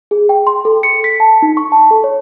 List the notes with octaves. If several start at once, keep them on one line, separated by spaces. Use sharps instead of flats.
G#4
G5
C6
A4
C#7
B6
A5
D#4
C#6
A5
A4
C#5